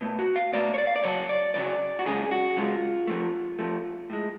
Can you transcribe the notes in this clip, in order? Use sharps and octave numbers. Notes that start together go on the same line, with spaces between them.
B2 A3
F#4
F5
B2 A3 D5
C#5
D5
F5
D5
F#2 C#3 F#3 C#5
D5
F#2 C#3 F#3 D5
F#4
F#2 C#3 G#3 G#4
F#4
F#2 C#3 G#3 F4
F2 F3 A3
F2 F3 A3
A2 G#3